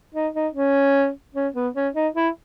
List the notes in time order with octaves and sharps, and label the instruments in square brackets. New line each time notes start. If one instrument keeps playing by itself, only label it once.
[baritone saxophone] D#4
D#4
C#4
C#4
B3
C#4
D#4
E4